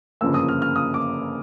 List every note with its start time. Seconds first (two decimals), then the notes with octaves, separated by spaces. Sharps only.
0.21 G1 F#2 C#3 F3 A#3 E6
0.34 D#6
0.48 F6
0.62 F6
0.76 D#6
0.94 D6